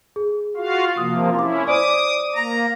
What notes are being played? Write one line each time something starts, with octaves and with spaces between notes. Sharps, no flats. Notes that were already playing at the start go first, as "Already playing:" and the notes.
G#4
F4 F#4 F5
C3 F3 A#3 D#6
C#4 E4 C6 D6
C5 D5 D6 D#6
A#3 A#5